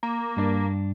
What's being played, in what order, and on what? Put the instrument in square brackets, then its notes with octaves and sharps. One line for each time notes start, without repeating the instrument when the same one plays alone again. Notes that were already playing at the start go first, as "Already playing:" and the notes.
[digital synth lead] A#3
[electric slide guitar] G2 D4 D5